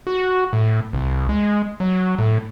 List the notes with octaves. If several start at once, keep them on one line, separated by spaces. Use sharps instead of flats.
F#4
A2
C2
G#3
F#3
A2